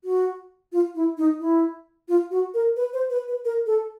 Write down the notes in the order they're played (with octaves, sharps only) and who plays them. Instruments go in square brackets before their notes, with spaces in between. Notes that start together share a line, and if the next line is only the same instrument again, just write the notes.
[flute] F#4
F4
E4
D#4
E4
F4
F#4
A#4
B4
C5
B4
B4
A#4
A4